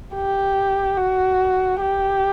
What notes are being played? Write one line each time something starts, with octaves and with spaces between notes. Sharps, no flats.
G4
F#4
G4